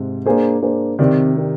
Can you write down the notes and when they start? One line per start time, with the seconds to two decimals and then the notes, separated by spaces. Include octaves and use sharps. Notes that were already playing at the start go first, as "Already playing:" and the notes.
Already playing: G#2 C3
0.26 A#3 D4 G#4 C5
0.62 A#3 D4 G#4 C5
0.99 C3 D#3 C4 G4 A#4 D5
1.36 C4 G4 A#4 D5